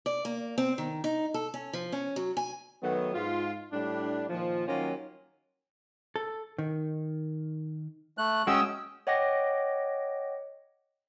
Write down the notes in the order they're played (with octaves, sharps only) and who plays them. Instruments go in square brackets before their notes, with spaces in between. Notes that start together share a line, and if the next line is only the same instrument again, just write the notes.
[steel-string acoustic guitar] D5
A#3
C4
D#3
D#4
A4
C#4
F3
C#4
F#3
G#5
[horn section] D#3 F#3 A3 B3
G#2 F4
A2 G3 D4
A#2 D#3 F3
D#3 F#3 A#3 C#4 F4
[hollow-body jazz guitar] A4
D#3
[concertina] A3 F#6
[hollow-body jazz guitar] G#3 F#4 [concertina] C#4 G5 E6 [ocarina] D#6
[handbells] C#5 D#5 F#5 G5 D6 A#6